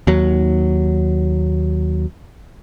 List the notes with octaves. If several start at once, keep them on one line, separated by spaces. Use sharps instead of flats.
D#2 F#3